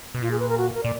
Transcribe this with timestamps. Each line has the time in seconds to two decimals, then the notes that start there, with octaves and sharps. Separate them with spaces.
0.15 B2
0.22 A#2 F4
0.31 G#4
0.39 B4
0.49 A#4
0.58 F#4
0.75 A#4
0.83 A#2 D5